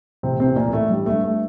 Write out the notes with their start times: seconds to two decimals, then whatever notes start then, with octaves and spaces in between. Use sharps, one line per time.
0.23 A1 C3 C4
0.40 C3 C4
0.46 E3
0.56 A#2 A#3
0.68 A1
0.73 A3
0.90 G2 G3
1.06 A3
1.12 G2
1.23 A3